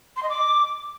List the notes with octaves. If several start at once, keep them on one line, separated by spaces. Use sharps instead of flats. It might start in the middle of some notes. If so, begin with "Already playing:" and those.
C6
D#5
D6